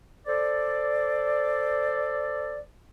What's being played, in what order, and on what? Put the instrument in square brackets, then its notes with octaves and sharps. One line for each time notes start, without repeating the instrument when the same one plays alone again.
[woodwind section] A4 C5 D5